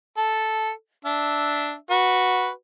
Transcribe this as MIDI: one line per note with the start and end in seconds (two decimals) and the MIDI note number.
0.17 0.70 69
1.05 1.74 62
1.05 1.74 76
1.91 2.49 66
1.91 2.49 71